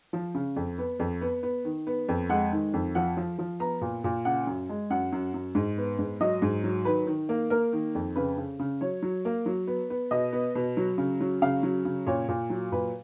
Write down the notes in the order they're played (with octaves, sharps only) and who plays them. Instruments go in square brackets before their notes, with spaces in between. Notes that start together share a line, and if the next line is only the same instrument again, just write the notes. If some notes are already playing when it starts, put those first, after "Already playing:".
[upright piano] F3
C#3
F2
B3
F2
B3
B3
D#3
B3
F2
G#3 F#5
D#3
F2
F3 F#5
F3
F3
B3 A#5
A#2
A#2
C#3 F#5
F#2
G#3
F#2 F#5
F#2
F#2
G#2
B3
G#2
F#3 D#5
G#2
F#3
D#3 B4
D#3
A#3
A#3 A#4
D#3
F2
C#3 B4
C#3
C#3
F#3 C#5
F#3
A#3
F#3
B3
B3
B2 D#5
B3
B2
F#3
C#3
F#3
C#3 F5
F#3
C#3
A#2 C#5
A#2
F#3
A#2 B4